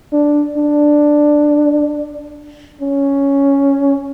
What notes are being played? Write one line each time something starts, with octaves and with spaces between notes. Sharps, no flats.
D4
D4
C#4